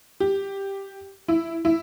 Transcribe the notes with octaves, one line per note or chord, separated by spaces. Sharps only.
G4
E4
E4